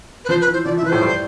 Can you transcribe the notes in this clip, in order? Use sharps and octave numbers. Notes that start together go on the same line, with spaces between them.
B4
F3 C5
B4
E3
C5
F3 D5
E3
E5
F3
B4
A2 A3 C5
G2 G3